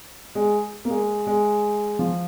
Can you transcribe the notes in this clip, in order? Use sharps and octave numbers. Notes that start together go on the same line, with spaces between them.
G#3
A#3
G#3
G#3
F3